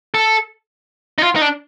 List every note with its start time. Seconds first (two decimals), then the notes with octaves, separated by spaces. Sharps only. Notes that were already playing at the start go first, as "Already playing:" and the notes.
0.14 A4
1.18 D#4
1.23 F4
1.36 D#4
1.42 D4